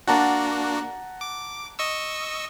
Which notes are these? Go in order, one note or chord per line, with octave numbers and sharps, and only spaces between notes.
A#3 D4 F#4 F#5 A5 A#5
D6
D#5 C#6 E6